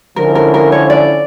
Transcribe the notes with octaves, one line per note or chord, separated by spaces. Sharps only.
D3 F3 C#4 E4 A#4
A#4
A#4
C#5
D5